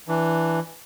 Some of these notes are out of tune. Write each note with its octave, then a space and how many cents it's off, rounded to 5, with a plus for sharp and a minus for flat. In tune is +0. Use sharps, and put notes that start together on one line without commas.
E3 +0 D4 +0